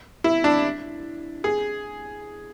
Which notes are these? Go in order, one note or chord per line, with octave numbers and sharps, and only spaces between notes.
E4
D4
G#4